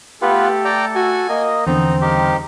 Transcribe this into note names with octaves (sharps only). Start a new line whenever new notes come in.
A3 B3 F4 G4 A4 B4
D5 G5 A#5
F#4 G#5
A#3 D#5
E2 D3 F3 B3 C4 D#4 A#5
C#3 G3 D#4 G4 A#4